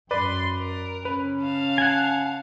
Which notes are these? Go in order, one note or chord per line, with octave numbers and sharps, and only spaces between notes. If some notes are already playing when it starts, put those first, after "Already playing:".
F#2 B4 D5 C6
A#4
C#3 C#4 B4
F5 A5
F#5 G#5